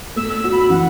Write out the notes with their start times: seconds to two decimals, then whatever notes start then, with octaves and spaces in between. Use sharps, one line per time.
0.16 A3 E6
0.35 E6
0.44 F#4
0.52 B5
0.70 E3 F#5